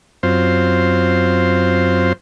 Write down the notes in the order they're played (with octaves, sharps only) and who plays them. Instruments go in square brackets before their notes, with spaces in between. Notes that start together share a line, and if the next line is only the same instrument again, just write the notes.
[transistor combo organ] F#2 C4 F4 C5